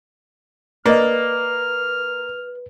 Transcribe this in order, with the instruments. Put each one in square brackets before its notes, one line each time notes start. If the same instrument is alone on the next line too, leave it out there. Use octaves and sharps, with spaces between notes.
[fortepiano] A#3 [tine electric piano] B4 [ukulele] D5 D#5 [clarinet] F6